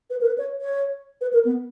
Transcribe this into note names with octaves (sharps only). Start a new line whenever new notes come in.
B4
A#4
B4
C#5
C#5
B4
A#4
B3